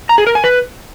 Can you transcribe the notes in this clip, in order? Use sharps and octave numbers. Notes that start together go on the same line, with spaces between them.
A#5
G#4
A#4
G#5
B4